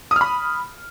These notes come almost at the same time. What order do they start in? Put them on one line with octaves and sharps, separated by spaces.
D#6 F6 B5